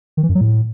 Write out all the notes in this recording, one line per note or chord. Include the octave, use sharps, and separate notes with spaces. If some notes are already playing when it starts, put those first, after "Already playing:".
D#3
E3
F#2
F#3
A2